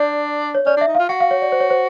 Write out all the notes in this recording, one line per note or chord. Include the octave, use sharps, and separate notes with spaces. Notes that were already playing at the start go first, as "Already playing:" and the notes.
Already playing: D4 D5
C#5
C#4 D5
D4 E5
D#4
F4 F5
F#4 F#5
F5
C#5
D5
C5
C#5
C5